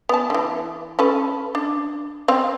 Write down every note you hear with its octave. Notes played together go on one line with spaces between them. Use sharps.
B3 A5
D3 E3
C#4 A4 B4
D4
C4 F5